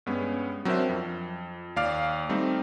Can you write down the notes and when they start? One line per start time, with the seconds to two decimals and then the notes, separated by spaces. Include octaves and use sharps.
0.06 G2 G#3 B3 C#4
0.65 F#3 C4 D4 A#4 C5 E5
0.89 F2
1.76 D#2 D5 F5 D6 F6
2.29 G3 A3 C4 D#4